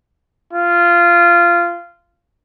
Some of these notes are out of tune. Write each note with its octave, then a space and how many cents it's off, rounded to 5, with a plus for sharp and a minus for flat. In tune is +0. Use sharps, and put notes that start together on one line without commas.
F4 -15